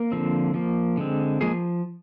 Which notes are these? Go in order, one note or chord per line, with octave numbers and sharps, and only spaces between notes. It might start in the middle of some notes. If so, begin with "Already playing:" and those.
Already playing: A#3 A#4
D3 F3 C4
F3 A#3
D3 G#3 C4
F3 G#3 A#3 G#4